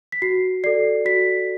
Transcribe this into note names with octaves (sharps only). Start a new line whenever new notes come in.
B6
F#4 C7
A4 D5 C7
F#4 B6